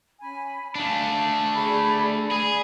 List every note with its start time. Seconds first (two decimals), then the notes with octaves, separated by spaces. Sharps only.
0.21 C#4 G#5 B5
0.75 A3 D4 F5 G#5
1.55 G#4 D5 B5
2.31 G#4 D5 B5